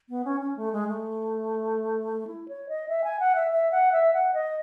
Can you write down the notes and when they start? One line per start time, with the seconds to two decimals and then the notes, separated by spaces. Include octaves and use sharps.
0.09 B3
0.25 C#4
0.41 C#4
0.57 A3
0.72 G#3
0.88 A3
2.27 E4
2.48 C#5
2.69 D#5
2.89 E5
3.04 G#5
3.20 F#5
3.35 E5
3.52 E5
3.71 F#5
3.92 E5
4.13 F#5
4.34 D#5